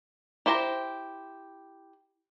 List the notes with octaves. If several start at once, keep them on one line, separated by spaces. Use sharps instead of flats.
E4 G4 C5 G#5 A#5